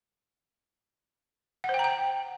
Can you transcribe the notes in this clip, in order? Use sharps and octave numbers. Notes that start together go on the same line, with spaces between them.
F#5
C5
G5
A#5
G5